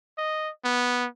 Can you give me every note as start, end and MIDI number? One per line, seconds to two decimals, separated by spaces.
0.18 0.50 75
0.65 1.06 59